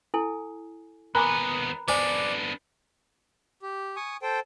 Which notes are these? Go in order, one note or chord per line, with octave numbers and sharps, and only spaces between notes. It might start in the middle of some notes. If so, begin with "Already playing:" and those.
E4 A4 G#5
D#2 B3 A#4 G#5 A#5 B5 D6 F#6
B3 D4 C5 D5 G#5
G4
G#5 C#6 D#6
A4 C5 G5